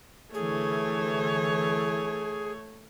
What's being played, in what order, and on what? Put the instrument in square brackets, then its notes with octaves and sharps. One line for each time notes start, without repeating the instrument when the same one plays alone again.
[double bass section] D3 E3 [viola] A3 C#5 [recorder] G#4